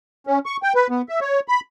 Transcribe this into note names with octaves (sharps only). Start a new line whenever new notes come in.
C#4
C#6
G5
B4
B3
E5
C#5
B5